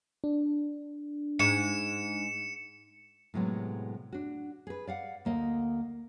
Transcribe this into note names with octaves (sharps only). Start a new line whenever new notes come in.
D4
G#2 C#7 E7
A2 C3 F#3 G#3 B3
D4 F#4
G#4 B4
D5 F5 F#5
D2 A#3 D#5